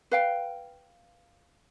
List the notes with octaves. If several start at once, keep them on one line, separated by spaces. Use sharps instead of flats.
B4 F5 G5